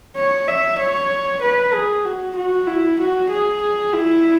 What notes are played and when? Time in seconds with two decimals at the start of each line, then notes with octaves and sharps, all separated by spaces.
0.16 C#5
0.48 E5
0.79 C#5
1.42 B4
1.74 G#4
2.05 F#4
2.36 F#4
2.67 E4
3.00 F#4
3.30 G#4
3.93 E4